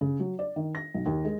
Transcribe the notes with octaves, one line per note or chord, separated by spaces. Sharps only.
C#3
F#3
D5
D#3
A#6
B1
D#2
G#3